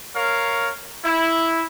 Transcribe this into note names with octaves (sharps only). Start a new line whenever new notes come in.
A#4 C#5 F5
E4